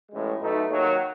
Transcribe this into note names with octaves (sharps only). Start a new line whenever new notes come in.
A1 A2 G#3
B1 B2 A3 D#4
D#2 D#3 F#3